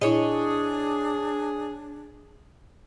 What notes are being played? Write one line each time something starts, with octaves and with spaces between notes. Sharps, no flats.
A#2 D4 E4 G#4 C#5 D#5